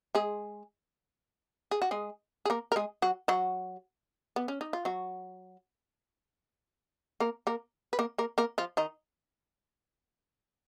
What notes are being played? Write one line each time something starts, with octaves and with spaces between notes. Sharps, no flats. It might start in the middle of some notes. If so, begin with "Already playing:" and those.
G#3 G#4
G#4
F#4
G#3 G#4
G#4
A#3 A#4
A#4
G#3 G#4
F#3 F#4
F#3 F#4
B3
C#4
D#4
F4
F#3 F#4
A#3 A#4
A#3 A#4
B4
A#3 A#4
A#3 A#4
A#3 A#4
F3 F4
D#3 D#4